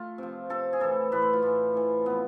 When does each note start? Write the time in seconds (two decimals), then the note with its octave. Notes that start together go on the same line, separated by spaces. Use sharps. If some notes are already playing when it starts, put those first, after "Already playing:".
Already playing: A3 F4
0.18 C3 F3
0.50 C3 F3 A4
0.73 G#4
0.80 A2 E3 A4
1.12 A2 E3 B4
1.22 C5
1.33 F4
1.43 A2 E3
1.74 A2 E3
2.06 C3 F3 B3